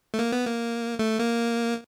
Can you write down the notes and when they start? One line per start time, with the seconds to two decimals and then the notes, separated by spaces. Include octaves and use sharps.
0.14 A3
0.19 A#3
0.32 B3
0.46 A#3
0.99 A3
1.20 A#3